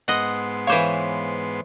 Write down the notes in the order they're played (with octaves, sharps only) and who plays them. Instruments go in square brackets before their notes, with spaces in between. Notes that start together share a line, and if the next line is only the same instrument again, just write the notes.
[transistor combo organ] G#2 B3 C6 [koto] D#5 F#5
[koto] E3 C5 C#5 [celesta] F5 D6